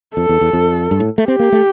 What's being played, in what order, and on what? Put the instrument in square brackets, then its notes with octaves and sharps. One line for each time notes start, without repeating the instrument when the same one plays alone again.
[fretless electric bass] F2 [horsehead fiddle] A4
[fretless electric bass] E2
E2
F2
G2
A2
A3
[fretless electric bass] C4 [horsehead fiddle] G4
[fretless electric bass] A#3
A3